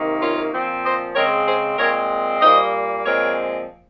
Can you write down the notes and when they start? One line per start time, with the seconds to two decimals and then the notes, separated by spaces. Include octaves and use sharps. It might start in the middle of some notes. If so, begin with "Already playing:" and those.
Already playing: C3 D#3 A#3
0.21 C#4 F4
0.53 A#2 F3 C4
0.84 C5 D#5
1.15 C#3 G#3 C4 A#4 C#5
1.47 G#4 C5
1.78 A#2 G#3 C4 A#4 C#5
2.41 A#2 G3 A#3 C5 D#5
3.04 A#2 F3 G#3 C4 A#4 C#5